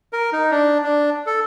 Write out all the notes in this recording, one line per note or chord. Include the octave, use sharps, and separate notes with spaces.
A#4
D#4
D4
D4
A4